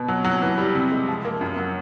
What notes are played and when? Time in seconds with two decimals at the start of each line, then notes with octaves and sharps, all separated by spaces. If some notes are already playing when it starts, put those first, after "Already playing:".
Already playing: B2
0.08 F#3
0.24 F#3
0.42 E3
0.58 G3
0.75 C3
0.92 G#3
1.08 F3
1.25 A#3
1.41 F#2
1.57 F#3